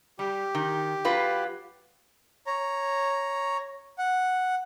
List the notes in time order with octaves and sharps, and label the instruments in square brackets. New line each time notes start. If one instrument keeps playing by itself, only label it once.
[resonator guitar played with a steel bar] G3 [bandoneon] G4
[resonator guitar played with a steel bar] D#3
F#3 F4 B4
[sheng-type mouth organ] C#5 A#5
F#5